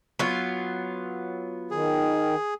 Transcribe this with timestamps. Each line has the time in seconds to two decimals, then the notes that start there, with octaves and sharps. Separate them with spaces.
0.19 F#3 B3 F4
1.71 D#3 G#4